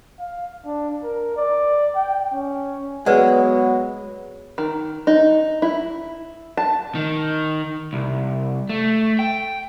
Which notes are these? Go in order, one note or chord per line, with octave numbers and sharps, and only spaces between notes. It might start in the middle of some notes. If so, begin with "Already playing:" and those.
F5
D4
A#4
D5
G5
C#4
F#3 G#3 B3 B4 D5 F#5
D#3
D#4
E4
A5
D#3
C2
A3
G5